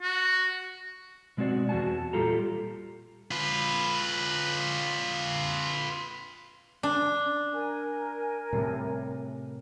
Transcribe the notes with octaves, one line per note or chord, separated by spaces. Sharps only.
F#4
B2 G#3 C4 F#4 D5
E2 F#4 G#5 A5
A#2 G3 F4 G4 A4 A#5
F4 B4
D4
A#4 G#5
A2 C3 G3